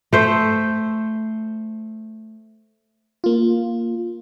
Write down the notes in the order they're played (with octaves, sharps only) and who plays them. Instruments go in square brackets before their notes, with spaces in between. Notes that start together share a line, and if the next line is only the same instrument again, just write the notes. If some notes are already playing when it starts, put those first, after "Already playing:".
[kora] A3 C5 E5
[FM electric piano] A#3 F4